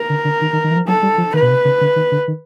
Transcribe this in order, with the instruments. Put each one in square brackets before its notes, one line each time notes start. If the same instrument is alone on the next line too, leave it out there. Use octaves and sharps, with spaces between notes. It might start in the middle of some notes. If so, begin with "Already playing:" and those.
Already playing: [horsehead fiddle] A#4
[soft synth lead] D3
D3
D#3
D#3
D#3
E3
F3
[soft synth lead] F#3 [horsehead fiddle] A4
[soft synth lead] G3
F3
[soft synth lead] D#3 [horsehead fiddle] B4
[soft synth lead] B2
C3
C#3
D3
D#3
D3
D#3